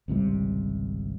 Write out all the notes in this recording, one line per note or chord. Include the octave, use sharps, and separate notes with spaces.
G#1 C#2 C3 G3